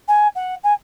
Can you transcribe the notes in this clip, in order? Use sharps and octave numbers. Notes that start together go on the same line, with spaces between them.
G#5
F#5
G#5